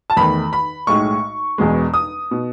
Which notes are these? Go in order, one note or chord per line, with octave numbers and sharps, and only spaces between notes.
A5
E2 D#3 A3 B5
B5
B1 A2 G#3 C#6
E1 E2 B2 G#3
D#6
B2